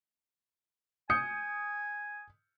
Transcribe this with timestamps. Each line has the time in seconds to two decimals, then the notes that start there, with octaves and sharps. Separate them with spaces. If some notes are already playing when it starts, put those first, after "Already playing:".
1.10 G#5 D#6 G6 C#7